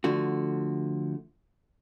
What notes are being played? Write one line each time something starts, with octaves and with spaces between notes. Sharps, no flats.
D3 F3 A3 F#4